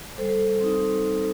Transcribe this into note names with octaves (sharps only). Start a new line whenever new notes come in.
G3 A4 C5
C4 D#4